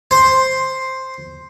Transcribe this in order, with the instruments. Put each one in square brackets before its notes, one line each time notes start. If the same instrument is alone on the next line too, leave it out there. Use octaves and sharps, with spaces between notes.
[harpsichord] C5